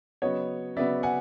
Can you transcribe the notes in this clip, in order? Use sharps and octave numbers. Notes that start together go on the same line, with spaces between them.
C#3 F#3 B3 C#5 D#5
C#3 F#3 B3 D5 E5
F#5 G#5